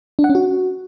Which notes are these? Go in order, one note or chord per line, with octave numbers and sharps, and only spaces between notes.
D4
F#5
C#4
F#4